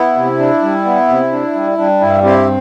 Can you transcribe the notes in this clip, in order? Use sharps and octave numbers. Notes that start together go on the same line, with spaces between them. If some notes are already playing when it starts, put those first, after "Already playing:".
Already playing: B3 E4
C3
D4
G3
B3
C3
D4
G3
G3 D4
G2 E4
C4 E4 G4